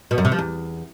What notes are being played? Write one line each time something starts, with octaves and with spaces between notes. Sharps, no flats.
B2
F#2
C3
F3
E2